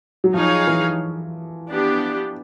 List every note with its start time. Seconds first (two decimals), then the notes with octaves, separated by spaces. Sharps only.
0.24 F#3
0.33 F3 D#4 G#4 C#5 F5
0.67 E3
1.68 B3 D4 G4